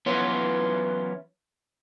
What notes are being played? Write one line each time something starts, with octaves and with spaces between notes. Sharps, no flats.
E3 F#3 B3 C#4 E4 F4